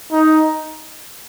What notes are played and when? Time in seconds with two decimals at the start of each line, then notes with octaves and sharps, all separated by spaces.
0.12 D#4